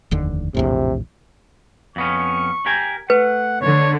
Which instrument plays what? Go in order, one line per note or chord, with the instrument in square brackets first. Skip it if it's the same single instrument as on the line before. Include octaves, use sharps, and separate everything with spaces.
[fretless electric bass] F1 D#2 D3
[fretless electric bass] A#1 E2 A2 [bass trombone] C3
[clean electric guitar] F2 B3 C#4 [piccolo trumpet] C#6
[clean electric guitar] G4 A#4 G#5
[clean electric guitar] A3 [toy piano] B4 [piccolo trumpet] F#5
[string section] D3 [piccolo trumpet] C#5